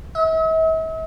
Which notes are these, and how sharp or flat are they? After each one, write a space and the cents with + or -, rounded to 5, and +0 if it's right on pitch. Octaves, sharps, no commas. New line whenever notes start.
E5 -45